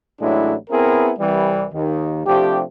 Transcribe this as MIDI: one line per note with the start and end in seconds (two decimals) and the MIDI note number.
0.20 0.55 33
0.20 0.55 45
0.20 0.55 54
0.20 0.55 56
0.20 0.55 62
0.20 0.55 64
0.70 1.10 59
0.70 1.10 60
0.70 1.10 64
0.70 1.10 68
0.70 1.10 70
1.18 1.66 36
1.18 1.66 52
1.18 1.66 55
1.72 2.22 39
1.72 2.22 51
2.26 2.62 48
2.26 2.62 53
2.26 2.62 57
2.26 2.62 62
2.26 2.62 67